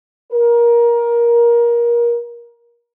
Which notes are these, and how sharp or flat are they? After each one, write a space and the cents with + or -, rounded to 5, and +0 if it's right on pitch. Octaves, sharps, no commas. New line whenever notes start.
A#4 +20